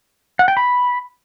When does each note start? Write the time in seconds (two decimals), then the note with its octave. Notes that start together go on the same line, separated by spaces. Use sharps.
0.39 F#5
0.48 G5
0.57 B5